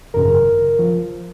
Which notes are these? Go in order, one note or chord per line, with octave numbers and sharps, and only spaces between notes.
G#1 F#2 C#3 A#4
F3